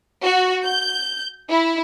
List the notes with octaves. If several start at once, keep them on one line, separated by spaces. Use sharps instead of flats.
F#4
G6
E4